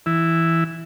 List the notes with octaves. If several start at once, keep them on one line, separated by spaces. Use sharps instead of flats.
E3 E4